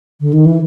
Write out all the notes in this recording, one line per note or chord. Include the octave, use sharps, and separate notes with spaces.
D3
D#3
E3